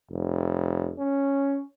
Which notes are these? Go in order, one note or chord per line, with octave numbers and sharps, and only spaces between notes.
F1
C#4